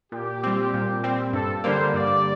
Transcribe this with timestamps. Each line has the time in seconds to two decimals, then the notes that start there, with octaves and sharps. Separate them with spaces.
0.12 A#2 G4
0.43 G3 C4
0.74 A#2
1.04 G3 C4
1.33 G2 A4
1.64 D3 G3 A#3 C5
1.94 G2 D5